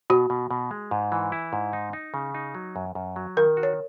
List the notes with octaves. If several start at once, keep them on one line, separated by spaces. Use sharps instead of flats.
B2 F#4
B2
B2
G#3
G#2
E3
E4
G#2
D#4
D#4
C#3
D#4
F#3
F#2
F#2
F#3
D#3 A#4
F#4
C#5